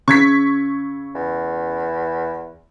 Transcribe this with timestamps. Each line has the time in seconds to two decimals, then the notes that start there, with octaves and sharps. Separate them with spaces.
0.08 C#3 C#6 G#6 B6
1.15 E2